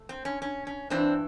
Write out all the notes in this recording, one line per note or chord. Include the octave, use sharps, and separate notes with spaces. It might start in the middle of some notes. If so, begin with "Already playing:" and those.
Already playing: A3
C4
C#4
C#4
C#4
G2 E3 C4 D4